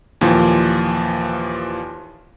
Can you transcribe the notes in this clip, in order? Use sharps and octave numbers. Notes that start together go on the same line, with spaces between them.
D#2 A#2 E3 F3